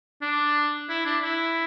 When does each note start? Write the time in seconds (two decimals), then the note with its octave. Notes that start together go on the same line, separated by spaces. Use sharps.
0.22 D4
0.89 E4
1.06 D4
1.23 E4